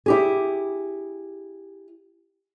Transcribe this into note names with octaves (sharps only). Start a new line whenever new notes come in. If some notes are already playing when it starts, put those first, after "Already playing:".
E4 G4 G#4